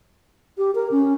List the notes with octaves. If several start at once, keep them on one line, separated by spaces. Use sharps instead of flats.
G4
A#4
C#4